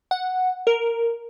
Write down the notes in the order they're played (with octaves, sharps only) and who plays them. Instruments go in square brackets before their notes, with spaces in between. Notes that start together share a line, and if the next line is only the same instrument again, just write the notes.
[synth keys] F#5
A#4